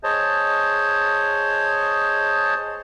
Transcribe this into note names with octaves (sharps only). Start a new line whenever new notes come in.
G#4 C5 C#5 D#5 A5